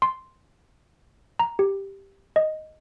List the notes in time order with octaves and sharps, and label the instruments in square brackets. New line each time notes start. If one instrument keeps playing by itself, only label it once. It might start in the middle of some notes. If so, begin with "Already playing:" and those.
[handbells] C6
A#5
G4
D#5